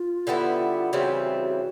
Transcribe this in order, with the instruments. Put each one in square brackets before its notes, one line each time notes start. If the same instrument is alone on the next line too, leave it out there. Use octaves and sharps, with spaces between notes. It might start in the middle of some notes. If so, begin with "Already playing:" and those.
Already playing: [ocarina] F4
[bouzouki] D3 G3 B3 E4
[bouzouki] C#3 E3 G3 C4 [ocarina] F#4